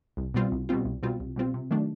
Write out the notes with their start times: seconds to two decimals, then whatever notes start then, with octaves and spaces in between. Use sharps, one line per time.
0.17 C2
0.34 B2 G3 C4 F4
0.52 C2
0.69 B2 G3 C4 F4
0.85 C2
1.03 B2 G3 C4 F4
1.20 C2
1.36 B2 G3 C4 F4
1.54 C3
1.71 D#3 F#3 A3 D4